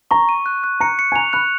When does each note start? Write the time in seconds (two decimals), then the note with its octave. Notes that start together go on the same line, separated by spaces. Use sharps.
0.11 A#5 C#6
0.29 D#7
0.46 F#6
0.64 F#6
0.80 A#5 C#7
0.99 C#7
1.12 G#5
1.16 A#5 F7
1.33 B5 F#6